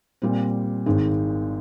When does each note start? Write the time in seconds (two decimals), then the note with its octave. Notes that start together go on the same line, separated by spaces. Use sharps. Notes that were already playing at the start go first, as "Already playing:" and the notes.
0.22 A#2 G3 C4
0.86 G#1 G#2 D#3